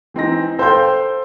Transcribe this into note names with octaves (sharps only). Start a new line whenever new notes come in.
E3 C4 D#4 A#6
A4 C5 F5 G5 C6 G6